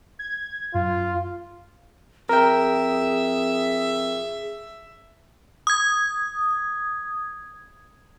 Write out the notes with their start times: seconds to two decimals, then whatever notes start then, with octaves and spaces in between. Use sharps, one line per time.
0.19 G#6
0.75 F#2 F4
2.29 F2 G#4 A#4 E5 G5
5.67 D#6 G#6